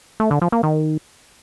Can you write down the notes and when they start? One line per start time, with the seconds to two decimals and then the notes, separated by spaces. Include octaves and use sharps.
0.20 A3
0.31 D3
0.42 F3
0.52 A#3
0.63 D#3